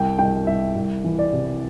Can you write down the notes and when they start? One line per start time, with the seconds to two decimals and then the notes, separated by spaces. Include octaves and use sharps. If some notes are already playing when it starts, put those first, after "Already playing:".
Already playing: C2 G5
0.19 C2 G5
0.47 C2 E5
0.76 C2
1.04 E3
1.19 D5
1.33 C3